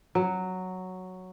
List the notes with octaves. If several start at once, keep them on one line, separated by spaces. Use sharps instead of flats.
F#3